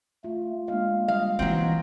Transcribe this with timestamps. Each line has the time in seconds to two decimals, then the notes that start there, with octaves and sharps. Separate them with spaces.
0.24 A3 F4
0.68 G#3 A#3 D4 F5
1.08 G3 D#5 F5
1.39 C#3 E3 F#3 C4